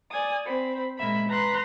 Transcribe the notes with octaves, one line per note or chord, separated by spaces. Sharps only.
D5 G#5 D#6
C4 B5
A#2 G#3 A#3 E5 B5
B4 A#5 C6 F#6